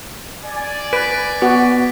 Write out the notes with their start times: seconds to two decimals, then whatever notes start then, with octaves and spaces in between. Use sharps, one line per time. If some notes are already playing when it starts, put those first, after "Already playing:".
0.45 D5 G#5
0.93 B4 B6 D7
1.42 B3 F#4